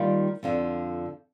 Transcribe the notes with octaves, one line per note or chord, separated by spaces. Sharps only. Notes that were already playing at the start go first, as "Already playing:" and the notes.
Already playing: D#3 G3 A#3 F4 A#4
F2 D3 F3